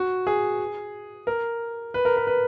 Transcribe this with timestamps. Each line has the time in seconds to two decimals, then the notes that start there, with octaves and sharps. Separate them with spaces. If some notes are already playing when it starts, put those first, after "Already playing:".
Already playing: F#4
0.27 G#4
1.27 A#4
1.94 B4
2.05 A#4
2.17 B4
2.27 B4